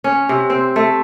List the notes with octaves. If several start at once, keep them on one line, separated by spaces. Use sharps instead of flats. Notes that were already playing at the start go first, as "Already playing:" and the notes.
C#4
C3
C4
A3